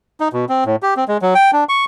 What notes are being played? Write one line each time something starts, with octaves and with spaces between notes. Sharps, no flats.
D#4
B2
C4
A2
G4
C4
G#3
F#3
G5
D4
C#6